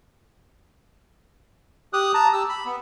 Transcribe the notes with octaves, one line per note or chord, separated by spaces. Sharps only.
G4 D#6 F#6
A5 A#5
G4 E6
B5
B3